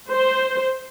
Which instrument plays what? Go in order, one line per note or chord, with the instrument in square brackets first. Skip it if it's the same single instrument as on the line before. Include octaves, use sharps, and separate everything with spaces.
[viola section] C5